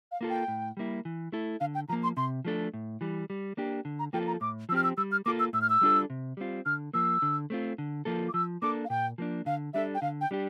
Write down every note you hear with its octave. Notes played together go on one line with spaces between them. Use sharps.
F5
A#3 F4 A4
G5
A2
G3 A#3 E4
E3
A3 E4 A4
D3 F5
G5
F3 A#3 A#5
C6
C3 C6
F3 A3 D4 A4
A2
E3 G3
G3
A#3 D4 G4
D3
A#5
F3 A#3 F4 A4 G5
A#5
A2 D6
F3 C4 G4 E6 F6
E6
G3 E6
F6
A#3 F4 A4 D6
E6
A2 E6
F6
E6
G3 D4 F4 A4
C3
G3 C4 F4
D3 F6
F3 A#3 E6
D3
A3 C4 F4
D3
F3 A#3 F4 A4
D6
F3 E6
A#3 D4 A4 D6
F5
A#2 G5
F3 A#3 D4
D3 F5
G3 D4 A4 E5
G5
D3 F5
G5
G3 D4 G4